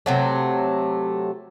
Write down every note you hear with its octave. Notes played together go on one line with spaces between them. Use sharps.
C3 F#3 A3